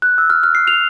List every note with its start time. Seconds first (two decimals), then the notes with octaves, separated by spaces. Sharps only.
0.02 F#6
0.18 E6
0.30 F6
0.43 F6
0.55 C7
0.67 F7